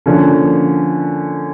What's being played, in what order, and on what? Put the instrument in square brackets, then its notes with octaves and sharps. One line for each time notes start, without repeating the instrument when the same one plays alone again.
[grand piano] D3 F3 A#3 C#4